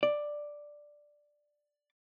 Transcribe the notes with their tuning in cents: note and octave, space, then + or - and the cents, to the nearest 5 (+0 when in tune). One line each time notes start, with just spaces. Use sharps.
D5 +5